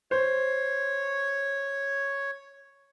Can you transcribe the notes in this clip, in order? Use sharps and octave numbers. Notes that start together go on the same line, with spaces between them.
C5 C#5